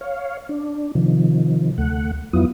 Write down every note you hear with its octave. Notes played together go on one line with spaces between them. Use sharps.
C#5 F5
D4
C3 D#3 F3
D2 A3 F#5
F2 F#3 B3 E4 F4 D#6